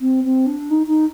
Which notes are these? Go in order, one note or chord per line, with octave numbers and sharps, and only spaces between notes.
C4
C4
D4
D#4
D#4